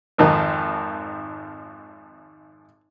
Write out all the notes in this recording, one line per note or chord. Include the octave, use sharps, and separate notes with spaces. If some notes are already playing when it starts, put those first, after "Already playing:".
G#1 F2 D#3 D#4